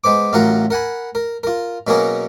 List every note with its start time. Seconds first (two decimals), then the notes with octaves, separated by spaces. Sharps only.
0.04 G#3 B3 C5 D6
0.33 A1 F#3 F4 A#4 F#5 A#5
0.70 A#4 F#5 G#5 B5
1.15 A#4
1.43 F4 A#4
1.87 B2 F#3 A#3 C#4 G#4 A#4